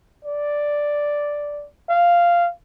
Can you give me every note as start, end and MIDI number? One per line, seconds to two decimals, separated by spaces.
0.25 1.66 74
1.89 2.49 77